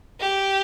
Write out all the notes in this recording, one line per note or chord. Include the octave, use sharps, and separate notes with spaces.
G4